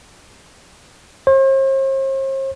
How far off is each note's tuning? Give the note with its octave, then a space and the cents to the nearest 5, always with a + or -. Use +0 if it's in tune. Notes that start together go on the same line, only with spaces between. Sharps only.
C5 +45